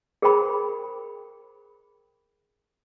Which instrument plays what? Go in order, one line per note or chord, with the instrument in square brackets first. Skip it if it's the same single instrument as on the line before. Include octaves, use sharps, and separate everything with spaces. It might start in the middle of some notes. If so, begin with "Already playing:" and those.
[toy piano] G#4 A#4 C5 G5 B5